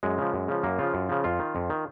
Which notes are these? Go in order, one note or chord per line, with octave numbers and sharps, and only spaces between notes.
F#2 G#3
C#3 F3
F#2
C#3 F3
F#2 A#3
C#3 F3 F4
F#2
C#3 F3
F2 F4
D#3
F2
D#3